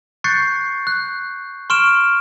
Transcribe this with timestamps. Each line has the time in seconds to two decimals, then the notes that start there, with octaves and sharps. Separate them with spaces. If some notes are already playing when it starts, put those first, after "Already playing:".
0.24 C#6 F#6 G6 A6 C7 C#7
0.87 F#6
1.70 C6 C#6 F6 D7 E7